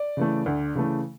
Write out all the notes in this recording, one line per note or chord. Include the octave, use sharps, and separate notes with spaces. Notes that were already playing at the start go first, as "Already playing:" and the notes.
Already playing: D5
C#3 E3 A3
D2
C#3 E3 A3